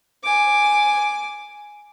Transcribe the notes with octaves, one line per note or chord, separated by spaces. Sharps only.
G#5 D6